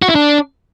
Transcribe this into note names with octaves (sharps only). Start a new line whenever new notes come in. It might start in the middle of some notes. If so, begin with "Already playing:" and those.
F#4
E4
D4